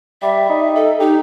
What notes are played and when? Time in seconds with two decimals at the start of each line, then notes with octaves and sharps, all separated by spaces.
0.22 G3 E5
0.49 D#4
0.76 A4
1.00 D#4 G4